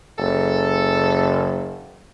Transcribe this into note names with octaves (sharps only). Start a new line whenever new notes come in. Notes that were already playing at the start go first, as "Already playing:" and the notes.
F#1 A4